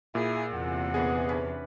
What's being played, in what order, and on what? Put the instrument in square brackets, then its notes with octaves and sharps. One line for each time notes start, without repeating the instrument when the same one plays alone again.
[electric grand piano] A#2 [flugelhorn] E4 [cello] G#4
[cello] E2 C3 [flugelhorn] F#5
[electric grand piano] A#2 B3 G#4 [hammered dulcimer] D3 E3 D#5
[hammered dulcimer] C#4 D4 B4